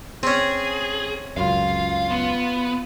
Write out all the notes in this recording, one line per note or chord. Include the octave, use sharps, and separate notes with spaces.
C4 C#4 G#4
C#2 F#2 F4 F5
B3